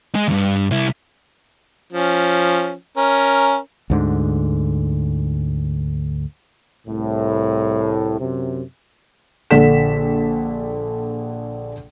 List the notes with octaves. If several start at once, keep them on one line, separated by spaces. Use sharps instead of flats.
G#3 G#4
D2 G2
C2 E4
F3 C#4
C#4 A#4
D2 G#2 D3
C2 A2
F#2 C3
A#1 D3 A4 B6 E7